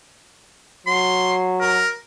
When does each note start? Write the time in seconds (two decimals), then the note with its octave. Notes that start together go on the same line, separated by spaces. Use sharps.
0.87 F#3 C6
1.61 A#4